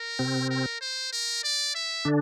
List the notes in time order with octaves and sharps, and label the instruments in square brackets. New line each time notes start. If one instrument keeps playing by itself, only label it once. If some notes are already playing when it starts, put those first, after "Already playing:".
Already playing: [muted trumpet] A#4
[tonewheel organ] C3 C4
[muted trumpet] A#4
C5
A#4
D5
E5
[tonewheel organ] D3 D4